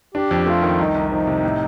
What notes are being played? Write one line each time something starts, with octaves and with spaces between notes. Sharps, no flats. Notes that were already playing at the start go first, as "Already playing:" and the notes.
D4 G4
F2
A3 F4
D#3
C2 D#4
C2
F3 D#4
C3
A2